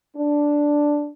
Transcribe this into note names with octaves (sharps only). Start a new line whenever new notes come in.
D4